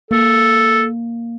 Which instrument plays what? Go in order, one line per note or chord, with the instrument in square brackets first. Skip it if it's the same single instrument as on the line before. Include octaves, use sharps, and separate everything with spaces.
[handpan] A#3 [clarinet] A4